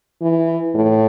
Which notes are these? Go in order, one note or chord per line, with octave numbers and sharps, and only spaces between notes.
E3
A2